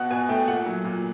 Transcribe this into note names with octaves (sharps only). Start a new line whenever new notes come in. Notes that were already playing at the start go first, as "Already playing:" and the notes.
Already playing: B2 F#5
B2 G#5
A3 G5
A#2 F#5
F#3
A#2